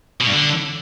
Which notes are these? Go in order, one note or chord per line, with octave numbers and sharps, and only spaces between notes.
B2
G2
D3